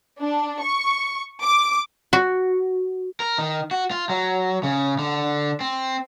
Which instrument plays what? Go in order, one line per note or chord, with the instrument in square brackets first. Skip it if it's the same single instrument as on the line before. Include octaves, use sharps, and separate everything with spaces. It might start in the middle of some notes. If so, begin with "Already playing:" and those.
[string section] D4
C#6
D6
[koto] F#4
[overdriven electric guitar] A#4
D#3
F#4
F4
F#3
C#3
D3
C4